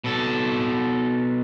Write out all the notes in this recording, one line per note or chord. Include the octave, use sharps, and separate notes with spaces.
B2 A4